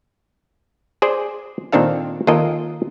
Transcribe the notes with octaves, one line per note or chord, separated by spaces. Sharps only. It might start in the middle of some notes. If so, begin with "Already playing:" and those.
G#4 C5 D5 G#5
A#2 D#3 C4 D4 A4 F5
D#2 F4 A4 A#4 D#5 G#5